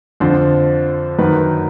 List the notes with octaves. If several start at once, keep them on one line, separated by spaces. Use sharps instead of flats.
F2 D3 F3 C5
F#2 D#3 F#3 B4